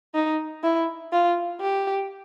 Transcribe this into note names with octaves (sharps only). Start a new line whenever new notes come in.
D#4
E4
F4
G4